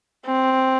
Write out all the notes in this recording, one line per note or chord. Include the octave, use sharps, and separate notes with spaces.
C4